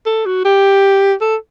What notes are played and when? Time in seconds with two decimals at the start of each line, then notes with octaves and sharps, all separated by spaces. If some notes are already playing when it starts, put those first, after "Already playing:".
0.06 A4
0.26 F#4
0.45 G4
1.21 A4